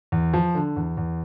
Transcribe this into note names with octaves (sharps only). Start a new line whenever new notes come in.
E2
F3
D3
E2
E2